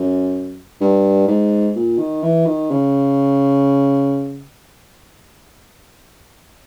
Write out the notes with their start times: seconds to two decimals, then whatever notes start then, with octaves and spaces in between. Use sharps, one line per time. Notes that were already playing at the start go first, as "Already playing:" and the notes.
Already playing: F#2
0.81 G2
1.28 G#2
1.76 A#2
1.98 D#3
2.23 E3
2.46 D#3
2.71 C#3